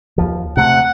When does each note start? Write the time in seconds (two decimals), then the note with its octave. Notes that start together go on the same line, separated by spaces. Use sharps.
0.18 D#2 F3
0.57 C3 A3 F#5